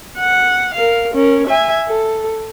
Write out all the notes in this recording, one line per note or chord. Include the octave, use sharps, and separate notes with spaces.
F#5
A#4 F5
C#4 A#4
E5 G#5
A4